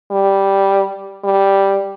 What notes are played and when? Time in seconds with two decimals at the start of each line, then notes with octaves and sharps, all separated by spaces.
0.11 G3
1.24 G3